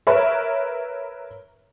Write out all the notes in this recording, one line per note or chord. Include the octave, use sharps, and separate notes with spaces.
A#4 B4 C#5 E5